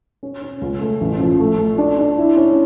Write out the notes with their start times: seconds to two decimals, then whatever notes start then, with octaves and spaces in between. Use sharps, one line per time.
0.23 C#4
0.42 C#4
0.61 C#2
0.81 A3
1.01 A1
1.20 F3
1.40 A3
1.59 A3
1.78 D4
1.98 D4
2.18 E4
2.37 C#4